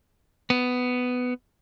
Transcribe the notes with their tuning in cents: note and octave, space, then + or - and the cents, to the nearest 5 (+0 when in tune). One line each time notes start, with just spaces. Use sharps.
B3 +10